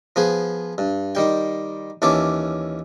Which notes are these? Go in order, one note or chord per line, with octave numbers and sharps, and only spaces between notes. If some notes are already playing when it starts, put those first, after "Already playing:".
F3 B3 G#4
G2
D#3 G3 G5
D#2 E3 C#4 A5 D6